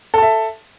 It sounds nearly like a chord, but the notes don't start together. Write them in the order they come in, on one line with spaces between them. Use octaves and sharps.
A4 A5 E5